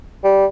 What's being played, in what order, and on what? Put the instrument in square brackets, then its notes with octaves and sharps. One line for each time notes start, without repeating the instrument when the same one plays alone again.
[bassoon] G3